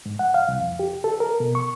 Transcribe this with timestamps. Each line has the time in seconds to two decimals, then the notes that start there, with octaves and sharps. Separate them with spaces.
0.06 G#2
0.19 F#5
0.34 F5
0.48 C2
0.61 F2
0.79 G4
1.04 A4
1.20 A#4
1.40 B2
1.55 C#6